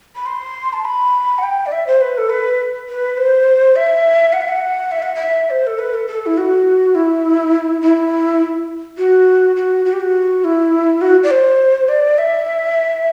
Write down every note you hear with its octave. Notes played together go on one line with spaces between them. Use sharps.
B5
C6
A5
B5
F#5
G5
D5
E5
C5
B4
A4
B4
B4
C5
E5
F#5
E5
F#5
E5
F#5
E5
C5
A4
B4
A4
A4
E4
F#4
E4
E4
F#4
F#4
F#4
G4
F#4
E4
F#4
D5
C5
D5
E5